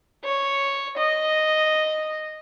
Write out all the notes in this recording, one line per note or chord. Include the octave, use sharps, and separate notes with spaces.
C#5
D#5